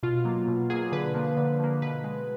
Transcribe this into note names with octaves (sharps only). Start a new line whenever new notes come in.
B2 F4
F#3 A#3
B2
F#3 A#3 G#4
D3 B4
F3 A#3
D3
F3 A#3
B2 B4
G#3